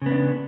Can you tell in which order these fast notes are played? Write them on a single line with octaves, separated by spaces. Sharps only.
C#3 B3 D4